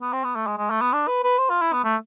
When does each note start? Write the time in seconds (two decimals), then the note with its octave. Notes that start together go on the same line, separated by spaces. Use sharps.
0.02 B3
0.13 C4
0.24 B3
0.35 A3
0.47 G#3
0.58 G#3
0.70 A3
0.81 B3
0.93 D4
1.08 B4
1.24 B4
1.39 C5
1.50 F4
1.62 E4
1.73 B3
1.84 A3